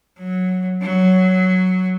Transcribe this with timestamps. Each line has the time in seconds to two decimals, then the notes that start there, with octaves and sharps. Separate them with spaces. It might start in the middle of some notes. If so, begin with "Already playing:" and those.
0.19 F#3
0.83 F#3